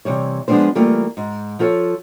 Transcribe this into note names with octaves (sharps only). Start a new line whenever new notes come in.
C3 E3 G3 C#5
F3 G#3 B3 C#4 D4 C5
E3 G3 A3 A#3 F4
G#2
F3 F4 A4 C#5